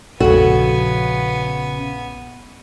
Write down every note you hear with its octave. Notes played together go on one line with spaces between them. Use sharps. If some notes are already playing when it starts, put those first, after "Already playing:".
A#1 F2 C#3 B3 F#4 A4 G#5